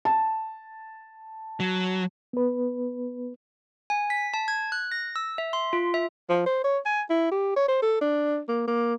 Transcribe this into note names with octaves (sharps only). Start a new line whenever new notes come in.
A5
F#3
B3 B4
G#5
B6
A5
G#6
F#6
A#6
E6
E5
C6
F4
E5
F3
C5
C#5
G#5
E4
G4
C#5
C5
A4
D4
A#3
A#3